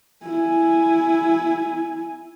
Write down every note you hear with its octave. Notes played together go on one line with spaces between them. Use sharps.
E4 G#5